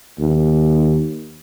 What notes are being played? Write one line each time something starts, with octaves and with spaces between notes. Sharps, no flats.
D#2